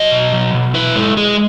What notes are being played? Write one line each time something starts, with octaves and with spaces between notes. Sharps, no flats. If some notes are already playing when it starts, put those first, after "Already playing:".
Already playing: F#3 D#5
B2
F#3
B2
E4 B4
G#3 A4
G#3 G#4